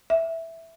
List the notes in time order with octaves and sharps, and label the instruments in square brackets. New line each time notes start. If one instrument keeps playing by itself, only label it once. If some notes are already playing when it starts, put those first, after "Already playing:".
[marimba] E5